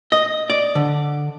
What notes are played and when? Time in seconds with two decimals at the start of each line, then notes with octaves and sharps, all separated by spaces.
0.12 D#5
0.50 D5
0.75 D3